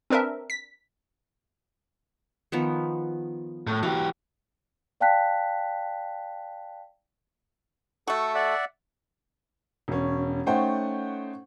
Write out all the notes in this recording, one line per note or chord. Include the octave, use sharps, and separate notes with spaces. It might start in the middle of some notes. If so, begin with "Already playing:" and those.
C4 D4 A#4 B4 E5
B6
D#3 F3 B3
A2
E3 F#4 G4
D5 F5 G5 A5 F#6 B6
A3 F#4 A4 C#6
D5 E5 F#5
E1 C#4
A3 C#4 D#4 C5 F#5 G5